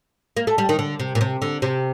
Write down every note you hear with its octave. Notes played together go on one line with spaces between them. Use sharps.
A#3
A3
G3
D#3
D3
C3
A#2
C3
D3
C3